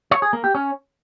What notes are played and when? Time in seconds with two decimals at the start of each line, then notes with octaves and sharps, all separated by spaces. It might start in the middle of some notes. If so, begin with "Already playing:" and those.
0.11 C#5
0.22 G#4
0.33 A#3
0.44 G4
0.55 C#4